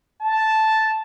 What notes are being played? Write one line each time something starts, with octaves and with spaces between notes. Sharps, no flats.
A5